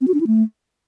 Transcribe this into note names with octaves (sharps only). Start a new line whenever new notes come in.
C4
F#4
D4
E4
A3